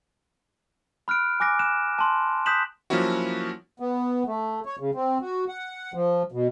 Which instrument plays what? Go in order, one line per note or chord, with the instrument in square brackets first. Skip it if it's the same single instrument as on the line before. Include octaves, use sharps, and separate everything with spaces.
[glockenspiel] B5 F6 F#6 D7
G#5 D6 F#6 A#6 D7
F#6 E7
A5 C6
D#6 F#6 G6 B6 E7 F#7
[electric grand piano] F3 F#3 A#3 C#4 E4 F#4
[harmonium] B3
A3
C#5
C#3
C4
F#4
F#5
F3
B2